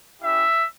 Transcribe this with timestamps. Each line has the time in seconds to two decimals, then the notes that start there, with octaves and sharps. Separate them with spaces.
0.21 C#4 E4 G4 E5